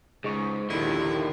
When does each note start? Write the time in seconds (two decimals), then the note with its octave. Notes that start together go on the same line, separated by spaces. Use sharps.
0.24 C#2 G#2 G#4 D#5 C#6
0.70 A#1 D#2 D3 D#3 E4